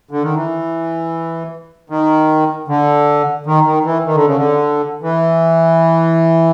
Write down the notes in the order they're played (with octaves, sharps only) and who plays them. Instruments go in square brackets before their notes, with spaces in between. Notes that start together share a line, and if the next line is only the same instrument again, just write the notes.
[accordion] D3
D#3
E3
D#3
D3
D#3
D#3
E3
D#3
D3
C#3
D3
E3